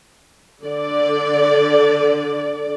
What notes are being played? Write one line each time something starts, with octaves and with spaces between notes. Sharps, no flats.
D3 D5